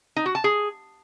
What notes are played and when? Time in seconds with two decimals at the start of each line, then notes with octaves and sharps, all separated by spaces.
0.16 D#4
0.26 F#4
0.35 A5
0.44 G#4